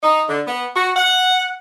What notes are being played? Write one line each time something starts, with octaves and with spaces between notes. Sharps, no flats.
D#4
D3
B3
F#4
F#5